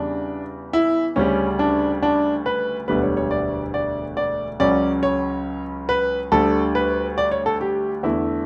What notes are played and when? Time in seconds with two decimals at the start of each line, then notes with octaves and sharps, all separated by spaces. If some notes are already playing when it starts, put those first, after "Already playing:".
Already playing: E2 C#3 G3 D4
0.73 E4
1.16 D2 C#3 G3 C#4
1.59 D4
2.03 D4
2.46 B4
2.88 E1 D2 D3 G3 B3 B4
3.03 C#5
3.17 C#5
3.31 D5
3.74 D5
4.17 D5
4.60 C#2 C#3 F#3 C#4 D5
5.03 C#5
5.89 B4
6.32 D2 D3 G3 A4
6.75 B4
7.18 D5
7.31 C#5
7.46 A4
7.61 G4
8.03 E2 D3 A3 E4